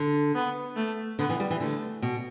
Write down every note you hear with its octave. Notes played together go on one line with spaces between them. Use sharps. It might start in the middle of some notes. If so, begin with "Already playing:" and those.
Already playing: D3
B3
A3
D3 B3
E3
G3
E3
D3 A3
B2